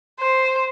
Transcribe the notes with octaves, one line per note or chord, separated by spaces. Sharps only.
C5